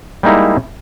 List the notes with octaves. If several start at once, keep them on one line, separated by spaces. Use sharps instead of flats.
G3 G#3 A#3 D#4 E4